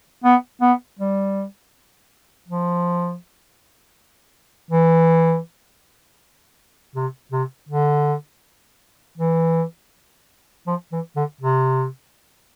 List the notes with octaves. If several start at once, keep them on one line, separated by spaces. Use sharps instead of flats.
B3
B3
G3
F3
E3
C3
C3
D3
E3
F3
E3
D3
C3